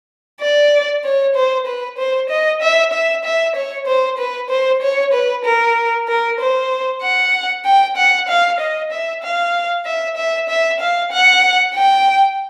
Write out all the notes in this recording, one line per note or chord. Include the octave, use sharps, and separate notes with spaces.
D5
C#5
C5
B4
C5
D#5
E5
E5
E5
C#5
C5
B4
C5
C#5
B4
A#4
A#4
C5
F#5
G5
F#5
F5
D#5
E5
F5
E5
E5
E5
F5
F#5
G5